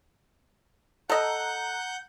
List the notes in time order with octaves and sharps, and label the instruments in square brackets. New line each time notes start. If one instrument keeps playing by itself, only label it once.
[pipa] A4 D#5 [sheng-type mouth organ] F#5 F#6 G6 [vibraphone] A#5